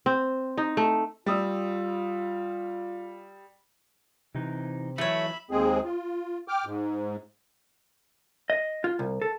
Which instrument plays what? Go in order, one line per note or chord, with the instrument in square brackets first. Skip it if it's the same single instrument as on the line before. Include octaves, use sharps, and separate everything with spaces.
[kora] C4
D#4
A3
[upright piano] G3 D#6 E6 [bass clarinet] F4
[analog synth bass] C3 [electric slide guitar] E3 D#4
[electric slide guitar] E3 F#3 [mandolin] A3 C#5 [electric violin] E5 B5
[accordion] D#2 G#3 C4 G#4
F4
G5 D6 F6
G#2
[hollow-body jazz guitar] D#5
F4
C2
A4